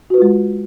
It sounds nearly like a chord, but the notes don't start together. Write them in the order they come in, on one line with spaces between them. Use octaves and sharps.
F#4 B4 F4 G#3